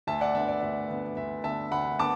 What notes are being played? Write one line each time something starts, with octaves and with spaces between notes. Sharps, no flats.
D2 E5 A5
D5 F#5
D3 B3 E5
D5
D2 E5
D3 B3
D2 E5
D3 B3 E5 A5
D2 F#5 B5
D3 B3 A5 D6